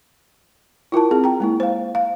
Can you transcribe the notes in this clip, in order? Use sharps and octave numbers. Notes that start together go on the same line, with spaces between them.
E4 F4 A#4 A5
C4 G#4
G5 A#5
G#3 A#3 E4
C5 F5
F5